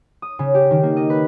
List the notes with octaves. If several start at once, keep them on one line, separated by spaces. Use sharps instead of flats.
D#6
C#3
G4
D#3
A#3
D#5
B4